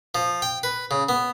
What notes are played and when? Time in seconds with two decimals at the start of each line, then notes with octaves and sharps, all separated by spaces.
0.15 F3
0.42 G5
0.63 B4
0.91 C#3
1.09 B3